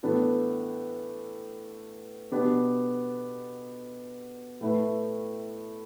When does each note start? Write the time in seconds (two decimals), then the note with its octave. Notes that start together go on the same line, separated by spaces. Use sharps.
0.03 A2 E3 B3 D4 A4
2.32 B2 B3 D4 G4
4.61 A2 A3 E4 B4